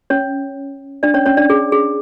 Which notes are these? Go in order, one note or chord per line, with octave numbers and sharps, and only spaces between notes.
C#4 C#5
D4 D5
C#4 C#5
C#4 C#5
D4 D5
G#4
G#4